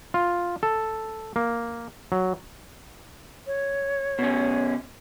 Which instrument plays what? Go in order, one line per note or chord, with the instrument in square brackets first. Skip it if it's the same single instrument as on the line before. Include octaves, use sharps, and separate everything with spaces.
[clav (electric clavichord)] F4
A4
A#3
F#3
[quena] C#5
[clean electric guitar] B2 C#4